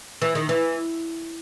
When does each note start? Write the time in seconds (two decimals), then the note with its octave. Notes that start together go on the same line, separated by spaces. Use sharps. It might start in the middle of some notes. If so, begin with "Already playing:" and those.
0.22 E3
0.35 D#3
0.49 E3